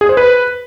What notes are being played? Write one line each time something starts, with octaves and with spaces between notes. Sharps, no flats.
G#4
C5
B4